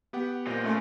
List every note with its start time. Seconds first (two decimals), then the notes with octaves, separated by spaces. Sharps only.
0.13 B3 G4 F#5
0.47 A#2 G4 C5 D#5 A#6
0.64 A3 C#4 F4